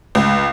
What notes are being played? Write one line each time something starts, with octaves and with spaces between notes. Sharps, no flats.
C#2